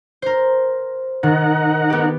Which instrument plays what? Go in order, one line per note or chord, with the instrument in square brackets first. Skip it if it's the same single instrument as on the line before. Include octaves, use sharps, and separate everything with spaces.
[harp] A#4 C5
[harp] D#3 [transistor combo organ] D#4 A#4 F#5
[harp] B3 G4